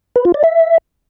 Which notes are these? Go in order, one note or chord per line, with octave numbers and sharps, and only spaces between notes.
B4
F4
D5
E5